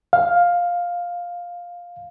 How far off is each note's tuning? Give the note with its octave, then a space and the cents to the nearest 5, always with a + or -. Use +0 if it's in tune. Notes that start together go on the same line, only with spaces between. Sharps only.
F5 +10